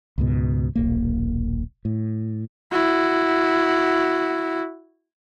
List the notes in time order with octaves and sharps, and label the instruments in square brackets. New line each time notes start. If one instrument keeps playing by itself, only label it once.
[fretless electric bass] C#2 G#2 B2
D#1 B1 A#3
A2
[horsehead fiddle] E4 F#4